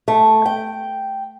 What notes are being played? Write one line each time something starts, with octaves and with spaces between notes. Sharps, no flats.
A3
G5